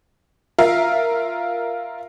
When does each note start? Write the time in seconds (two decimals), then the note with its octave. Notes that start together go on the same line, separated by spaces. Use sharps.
0.58 F4 A#4 E5 F5